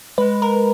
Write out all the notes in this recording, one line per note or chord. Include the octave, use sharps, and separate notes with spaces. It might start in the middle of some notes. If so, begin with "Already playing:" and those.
G#3 B4
A#4